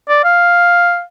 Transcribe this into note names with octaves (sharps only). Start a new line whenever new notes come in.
D5
F5